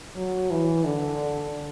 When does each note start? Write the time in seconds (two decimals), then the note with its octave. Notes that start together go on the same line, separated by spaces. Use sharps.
0.16 F#3
0.50 E3
0.85 D3